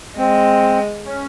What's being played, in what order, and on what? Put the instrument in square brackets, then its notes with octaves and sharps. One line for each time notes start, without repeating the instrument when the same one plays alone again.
[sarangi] G#3 [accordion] C4
[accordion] C#4